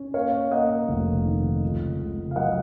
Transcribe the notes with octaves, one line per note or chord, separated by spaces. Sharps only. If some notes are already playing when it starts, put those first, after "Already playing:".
Already playing: C#4
A#3 C#5 F5
A#3 D#5 F#5
F1
D#3
C#2
C#2
F5
F#3 D#5 F#5